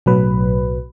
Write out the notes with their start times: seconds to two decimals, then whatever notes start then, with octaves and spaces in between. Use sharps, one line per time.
0.06 B1 A2 F#3 B4